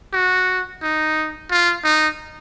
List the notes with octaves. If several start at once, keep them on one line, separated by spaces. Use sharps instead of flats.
F#4
D#4
F4
D#4